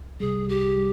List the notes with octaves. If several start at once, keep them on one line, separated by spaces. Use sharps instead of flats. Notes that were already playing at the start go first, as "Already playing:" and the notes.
Already playing: C2
C3 G3 G#4
C2 G4
G3